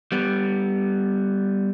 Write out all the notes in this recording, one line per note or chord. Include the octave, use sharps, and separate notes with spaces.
G3 B3